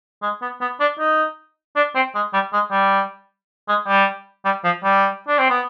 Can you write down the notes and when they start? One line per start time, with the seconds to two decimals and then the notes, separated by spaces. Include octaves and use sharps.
0.23 G#3
0.42 B3
0.61 B3
0.80 D4
0.99 D#4
1.76 D4
1.95 C4
2.15 G#3
2.34 G3
2.53 G#3
2.72 G3
3.68 G#3
3.87 G3
4.45 G3
4.64 F3
4.84 G3
5.28 D4
5.39 C4
5.50 B3